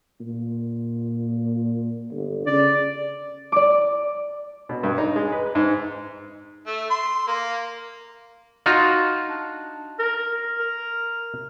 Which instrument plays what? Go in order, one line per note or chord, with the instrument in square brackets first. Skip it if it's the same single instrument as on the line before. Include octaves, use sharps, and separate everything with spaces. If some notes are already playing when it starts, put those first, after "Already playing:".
[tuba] A#2
G1
[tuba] C#3 [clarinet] D5
[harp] D5 D6
[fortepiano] B2
G2
D#4
G#3
B4
G#2
[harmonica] A3
C6
A#3
[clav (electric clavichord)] D#4 F4 F#4
[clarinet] D4
A#4
A#4